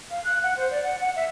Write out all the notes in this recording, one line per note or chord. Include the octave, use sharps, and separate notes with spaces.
F5
F#6
F#5
C5
D5
F#5
F#5
E5